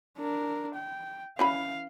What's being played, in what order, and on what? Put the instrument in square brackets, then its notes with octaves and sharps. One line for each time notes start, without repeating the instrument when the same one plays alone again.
[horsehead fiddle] D4 A#4
G5
[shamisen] E3 C#4 B5 [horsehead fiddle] F5